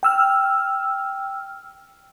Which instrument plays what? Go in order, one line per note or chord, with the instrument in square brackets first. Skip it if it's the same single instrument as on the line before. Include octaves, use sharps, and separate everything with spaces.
[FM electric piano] G5 E6 F6